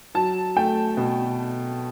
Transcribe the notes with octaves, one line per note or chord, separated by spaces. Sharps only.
F#3 A5
A3 G5
B2